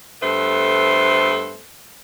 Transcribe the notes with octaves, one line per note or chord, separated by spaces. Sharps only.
G2 A3 B3 A4 C5